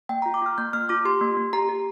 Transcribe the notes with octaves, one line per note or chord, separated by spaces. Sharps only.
A#3 G5
F4 A#5
D6
F4 F6
A#3 G6
A#3 F6
F4 D6
G4 C6
A#3
A#3
G4 A#5
G4